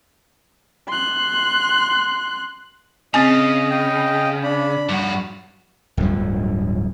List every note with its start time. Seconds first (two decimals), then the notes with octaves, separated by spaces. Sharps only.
0.88 C6 F#6
3.14 C#3 C4 D#5 G#5
3.71 D#5 G5
4.43 D4 B5
4.89 G2 F#4 B5
5.97 D1 D2 G2 F3